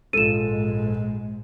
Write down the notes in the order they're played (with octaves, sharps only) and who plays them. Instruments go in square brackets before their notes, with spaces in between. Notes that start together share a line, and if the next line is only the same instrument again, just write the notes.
[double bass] A#1 G#2 [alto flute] G#3 [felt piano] F4 A4 [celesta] D#7 E7